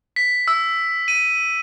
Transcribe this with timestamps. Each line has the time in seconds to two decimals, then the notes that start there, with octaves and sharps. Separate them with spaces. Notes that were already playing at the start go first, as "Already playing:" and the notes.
0.16 B6
0.48 E6
1.08 D#7